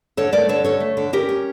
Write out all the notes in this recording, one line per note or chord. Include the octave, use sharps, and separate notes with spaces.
D3 A4 C#5
A3 A#4 D5
D3 A4 C#5
D3 A4 C#5
A3
D3
C#4 G4 A#4
C#4